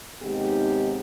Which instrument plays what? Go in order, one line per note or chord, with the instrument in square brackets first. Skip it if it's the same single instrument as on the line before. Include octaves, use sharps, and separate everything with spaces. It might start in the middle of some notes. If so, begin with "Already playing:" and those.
[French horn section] D#2 C3 G#3 B3 D#4 G4